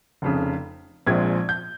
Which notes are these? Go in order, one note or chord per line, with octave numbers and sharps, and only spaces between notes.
F1 F2 C#3
A#1 A#2 G#3 C4 G#6
G6